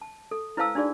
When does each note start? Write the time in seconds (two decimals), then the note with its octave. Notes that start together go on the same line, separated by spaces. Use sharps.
0.02 A5
0.31 A4
0.57 E4 B4 C5 F5 A5 E6
0.75 D4 D#4 F#4 G#4 D5